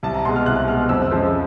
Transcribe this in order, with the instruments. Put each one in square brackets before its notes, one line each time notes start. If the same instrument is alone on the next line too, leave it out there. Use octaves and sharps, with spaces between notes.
[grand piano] C2 A5
A#5
B2 G#3 C6
F6
C2 F#6
B2 G#3 F6
F2 E6
C#3 F3 G#3